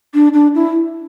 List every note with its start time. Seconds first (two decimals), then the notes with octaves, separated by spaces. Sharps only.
0.14 D4
0.33 D4
0.55 E4